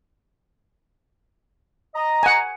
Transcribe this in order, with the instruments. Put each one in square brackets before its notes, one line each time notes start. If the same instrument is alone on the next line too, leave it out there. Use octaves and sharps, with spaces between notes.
[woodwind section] D#5 A#5
[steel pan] F#5 G#5